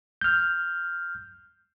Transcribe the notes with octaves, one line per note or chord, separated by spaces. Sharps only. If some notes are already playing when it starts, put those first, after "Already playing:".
F6 G6